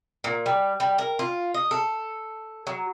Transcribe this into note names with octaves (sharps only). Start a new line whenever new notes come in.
A#2
G3
G3
A#4
F4
D#5
A4
F#3